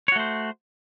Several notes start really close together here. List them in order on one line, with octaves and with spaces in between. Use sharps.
C#5 F#4 A3 C5